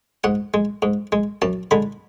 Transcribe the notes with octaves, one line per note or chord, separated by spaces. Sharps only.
G#2 F#5
G#3
G#2
G#3
F#2 A5
D3 G#3 B5